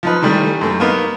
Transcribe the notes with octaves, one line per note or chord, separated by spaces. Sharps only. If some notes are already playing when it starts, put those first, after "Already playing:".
F3 D#4 B4
D#3 E3 G3 A3
F#2 A3
A#3 B3 D#4